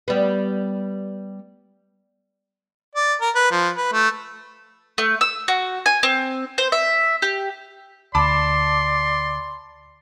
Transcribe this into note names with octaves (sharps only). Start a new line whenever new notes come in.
G3 B3
D5
A#4
B4
F3
B4
A3
A3
E6
F#4
G#5
C4
C5
E5
G4
D2 D5 A5 B5 C6 D6